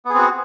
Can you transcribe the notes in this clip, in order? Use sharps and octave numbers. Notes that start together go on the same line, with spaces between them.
B3 C4 F#4 G#4